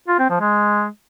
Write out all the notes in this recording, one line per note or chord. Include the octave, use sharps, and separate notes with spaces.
F4
C4
F3
G#3